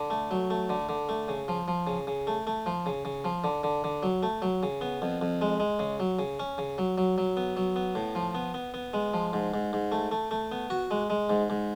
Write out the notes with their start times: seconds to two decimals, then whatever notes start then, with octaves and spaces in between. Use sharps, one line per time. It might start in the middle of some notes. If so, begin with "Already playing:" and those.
Already playing: D3
0.10 A3
0.31 F#3
0.50 A3
0.70 D3
0.89 D3
1.09 A3
1.28 C#3
1.48 F3
1.68 F3
1.87 C#3
2.07 C#3
2.27 A3
2.47 A3
2.66 F3
2.86 C#3
3.05 C#3
3.24 F3
3.44 D3
3.64 D3
3.84 D3
4.03 F#3
4.23 A3
4.42 F#3
4.63 C#3
4.81 B3
5.02 F2
5.21 F2
5.41 G#3
5.60 G#3
5.79 C#3
6.00 F#3
6.19 C#3
6.40 C#4
6.58 C#3
6.78 F#3
6.98 F#3
7.18 F#3
7.37 B3
7.57 F#3
7.76 B3
7.95 A2
8.15 F3
8.35 B3
8.54 B3
8.74 B3
8.94 G#3
9.14 F3
9.33 G#2
9.54 G#2
9.73 G#2
9.92 A3
10.11 A3
10.31 A3
10.52 B3
10.70 F#4
10.91 G#3
11.10 G#3
11.30 G#2
11.50 G#2